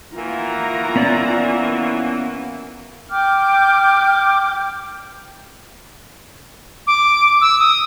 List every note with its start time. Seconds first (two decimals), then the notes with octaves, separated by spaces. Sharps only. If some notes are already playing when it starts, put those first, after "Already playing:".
0.16 E3 A#3 F4 F#4 A#5
0.96 B3 C#4 D5
3.11 G5 D6 F6 G6
6.87 D6
7.41 E6
7.59 D#6